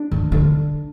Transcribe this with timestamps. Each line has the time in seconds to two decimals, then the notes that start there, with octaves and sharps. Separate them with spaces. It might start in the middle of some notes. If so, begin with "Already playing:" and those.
Already playing: D4
0.11 D#3
0.32 D3